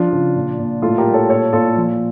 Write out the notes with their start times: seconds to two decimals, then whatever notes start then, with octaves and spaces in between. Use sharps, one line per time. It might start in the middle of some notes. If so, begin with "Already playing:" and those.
Already playing: F3 D4 F4
0.12 C#3
0.35 A#2
0.59 A#2
0.82 A2 F4 A4
0.98 G4 A#4
1.06 G3
1.14 A4 C#5
1.29 A#2 A4 C#5
1.53 A#2 F4 A4
1.77 F3